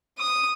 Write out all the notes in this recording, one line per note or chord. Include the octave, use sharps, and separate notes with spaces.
D#6